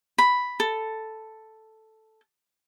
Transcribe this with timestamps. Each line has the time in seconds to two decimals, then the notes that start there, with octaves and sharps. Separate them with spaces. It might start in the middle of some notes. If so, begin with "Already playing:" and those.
0.18 B5
0.60 A4